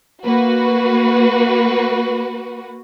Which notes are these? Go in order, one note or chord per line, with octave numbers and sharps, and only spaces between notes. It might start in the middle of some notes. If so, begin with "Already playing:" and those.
A#3 F#4 B4